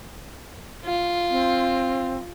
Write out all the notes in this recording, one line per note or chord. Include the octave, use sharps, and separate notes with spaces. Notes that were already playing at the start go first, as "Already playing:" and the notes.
F4
C4